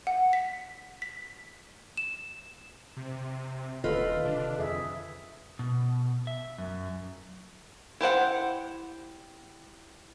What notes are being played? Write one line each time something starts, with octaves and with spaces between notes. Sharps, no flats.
F#5
B6
B6
E7
C3
D#1 D3 D#3 F4 A4 B4 D#5
C3 D4
F2 G#4 E5
B2
E5
F#2
E4 G4 C5 F#5